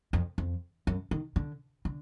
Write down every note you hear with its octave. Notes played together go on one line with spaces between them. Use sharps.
F2
F2
F#2
D#3
D3
D3